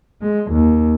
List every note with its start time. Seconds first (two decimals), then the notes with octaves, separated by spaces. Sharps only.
0.22 G#3
0.51 D#2